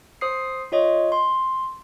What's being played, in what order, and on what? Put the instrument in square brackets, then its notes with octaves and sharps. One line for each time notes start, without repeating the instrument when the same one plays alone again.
[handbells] C5 D#6 C7
F4 C#5 D#5
C6